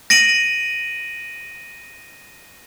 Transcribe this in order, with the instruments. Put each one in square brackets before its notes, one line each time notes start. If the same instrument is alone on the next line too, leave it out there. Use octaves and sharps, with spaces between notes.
[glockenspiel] A#6 D7 D#7 F#7